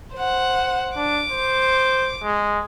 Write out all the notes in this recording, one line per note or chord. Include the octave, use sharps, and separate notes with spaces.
C5 F#5
D4 D6
C5
G#3